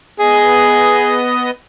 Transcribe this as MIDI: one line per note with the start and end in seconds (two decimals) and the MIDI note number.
0.19 1.50 59
0.19 1.18 68
0.19 1.50 75